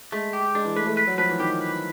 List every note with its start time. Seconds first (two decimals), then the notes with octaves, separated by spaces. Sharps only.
0.12 G#3 A3
0.33 G4
0.55 G#3 D4
0.65 E3
0.76 A3 B4
0.86 A3
0.97 B4
1.07 F#3
1.18 F3 B4
1.29 E3
1.39 D#3 G4
1.61 B4